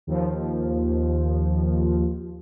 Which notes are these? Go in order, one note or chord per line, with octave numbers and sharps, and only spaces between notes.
D#2 F3